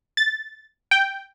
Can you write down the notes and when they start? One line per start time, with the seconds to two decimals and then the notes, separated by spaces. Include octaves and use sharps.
0.17 A6
0.91 G5